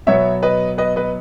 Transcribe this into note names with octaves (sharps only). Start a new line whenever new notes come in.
B2 F#3 B3 C#5 E5
B4 D#5
B4 D#5
B4 D#5